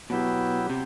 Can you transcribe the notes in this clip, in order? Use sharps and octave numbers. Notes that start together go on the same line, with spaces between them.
B2 F#3 B3 E4 G4
C3 G4